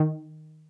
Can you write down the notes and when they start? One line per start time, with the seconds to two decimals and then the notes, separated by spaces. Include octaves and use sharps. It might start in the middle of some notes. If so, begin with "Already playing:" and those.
Already playing: D#3